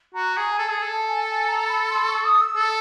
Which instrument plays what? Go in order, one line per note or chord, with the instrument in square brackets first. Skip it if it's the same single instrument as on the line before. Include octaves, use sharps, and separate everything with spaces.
[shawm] F#4 [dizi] A#5
[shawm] G#4 [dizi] A#5
[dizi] G#5
[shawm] A4 [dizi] A5
[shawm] G#4 [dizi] A5
[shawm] A4
[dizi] A5
G#5
G#5
A#5
B5
C6
C#6
D#6
E6
[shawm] A4